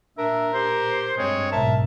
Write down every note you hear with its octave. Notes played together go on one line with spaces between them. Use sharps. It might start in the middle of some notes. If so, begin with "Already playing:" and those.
A#2 D4 A#4 E5
G4 C5
G2 G#3 C4 C#5
B1 G#2 A#4 E5 A5